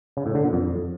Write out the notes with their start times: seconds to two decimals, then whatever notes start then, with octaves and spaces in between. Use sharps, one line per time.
0.17 C#3
0.26 A2
0.35 D3
0.44 A#2
0.53 F2